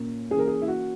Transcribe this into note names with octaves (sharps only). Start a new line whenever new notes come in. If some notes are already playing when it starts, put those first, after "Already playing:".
Already playing: A#2 A#3 C#4
E3 A#3 C#4 G#4
A#4
G#4
E4
F#4